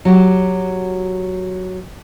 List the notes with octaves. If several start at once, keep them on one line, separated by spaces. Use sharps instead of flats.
F#3 F#4 G4